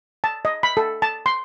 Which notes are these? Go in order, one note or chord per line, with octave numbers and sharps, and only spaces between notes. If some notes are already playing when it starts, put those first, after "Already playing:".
A5
D#5
B5
A4
A5
C6